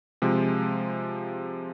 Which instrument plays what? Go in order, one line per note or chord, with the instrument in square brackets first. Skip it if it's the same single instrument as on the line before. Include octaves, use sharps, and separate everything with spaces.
[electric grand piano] C3 F3 G#3